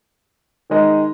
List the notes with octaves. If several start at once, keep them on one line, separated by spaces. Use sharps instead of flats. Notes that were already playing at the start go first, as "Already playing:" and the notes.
D#3 G#3 D#4 A#4 D#5